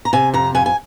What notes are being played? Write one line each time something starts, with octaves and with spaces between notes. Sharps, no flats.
A#5
C3 G#5
F2 A#5
F2 G#5
G#5